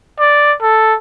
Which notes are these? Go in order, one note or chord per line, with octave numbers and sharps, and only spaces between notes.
D5
A4